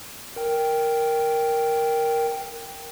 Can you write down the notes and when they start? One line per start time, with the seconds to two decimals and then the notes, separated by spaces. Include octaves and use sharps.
0.36 A#4 G5